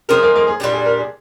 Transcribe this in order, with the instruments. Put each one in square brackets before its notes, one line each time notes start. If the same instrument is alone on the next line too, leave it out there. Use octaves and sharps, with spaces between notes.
[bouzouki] F3 G#3 D#4 A#4 [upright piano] C4
[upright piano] A#3
A#3
G#4
[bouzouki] A#2 G3 A#3 D4 [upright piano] G4
[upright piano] G#4
A#4
G#4